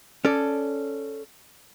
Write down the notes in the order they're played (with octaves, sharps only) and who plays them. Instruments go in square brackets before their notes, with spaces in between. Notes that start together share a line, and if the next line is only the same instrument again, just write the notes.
[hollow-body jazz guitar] C#4 A4 D5